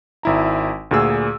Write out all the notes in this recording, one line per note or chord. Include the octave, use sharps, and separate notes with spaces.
G#1 E4 A#5
D2 A#2 G#4 E6